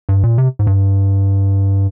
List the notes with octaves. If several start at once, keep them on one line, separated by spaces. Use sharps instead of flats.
G2
A#2
C3
G#2
G2